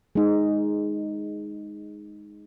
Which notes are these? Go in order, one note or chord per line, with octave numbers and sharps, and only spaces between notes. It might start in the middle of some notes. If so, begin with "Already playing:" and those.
G#3 D#4